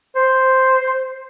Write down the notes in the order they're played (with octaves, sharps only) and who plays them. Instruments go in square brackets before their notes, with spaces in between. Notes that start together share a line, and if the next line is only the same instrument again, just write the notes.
[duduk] C5